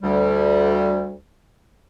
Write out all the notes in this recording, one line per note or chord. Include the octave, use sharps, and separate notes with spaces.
D2 G3